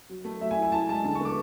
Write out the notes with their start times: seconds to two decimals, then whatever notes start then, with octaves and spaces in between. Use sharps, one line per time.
0.09 F#3
0.25 A3
0.41 F#3 E5
0.51 G#5
0.57 E4
0.62 G#5
0.72 E4 A5
0.89 G#3 A5
1.04 D3 A5
1.15 C#6
1.20 B3
1.25 D6